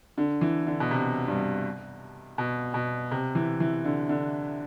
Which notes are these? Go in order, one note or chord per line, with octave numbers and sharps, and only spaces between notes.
D3
E3
D3
B2
C3
G2
B2
B2
C3
E3
E3
D3
D3